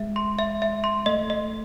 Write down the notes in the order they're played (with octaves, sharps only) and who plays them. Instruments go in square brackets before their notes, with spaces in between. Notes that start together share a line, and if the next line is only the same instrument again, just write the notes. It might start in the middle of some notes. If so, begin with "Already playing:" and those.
Already playing: [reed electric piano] G#3 [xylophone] E5
[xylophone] C6
E5
E5
C6
[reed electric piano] A3 [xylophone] D#5
[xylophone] D#5